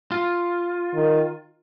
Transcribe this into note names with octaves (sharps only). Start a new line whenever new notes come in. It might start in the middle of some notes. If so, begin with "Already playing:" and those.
F4
D#3